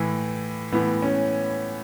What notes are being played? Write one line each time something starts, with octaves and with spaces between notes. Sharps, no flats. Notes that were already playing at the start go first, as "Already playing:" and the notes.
Already playing: A2 E3
A2 E3 B3
C#4